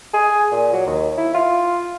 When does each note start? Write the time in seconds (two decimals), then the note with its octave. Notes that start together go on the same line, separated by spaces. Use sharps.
0.14 G#4
0.52 A#2
0.73 F#3
0.87 D#2
1.17 E4
1.34 F4